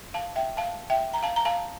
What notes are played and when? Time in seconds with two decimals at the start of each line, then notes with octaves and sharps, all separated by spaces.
0.14 F5 A5
0.36 E5 G5
0.57 F5 A5
0.90 E5 G5
1.14 A#5
1.23 F5 A5
1.36 A#5
1.45 F5 A5